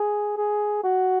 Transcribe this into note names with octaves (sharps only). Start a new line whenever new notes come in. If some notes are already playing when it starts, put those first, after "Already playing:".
Already playing: G#4
G#4
F#4